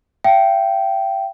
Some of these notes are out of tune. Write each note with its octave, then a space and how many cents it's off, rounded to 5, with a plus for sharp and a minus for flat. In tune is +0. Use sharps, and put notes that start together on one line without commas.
E5 +45 G5 -15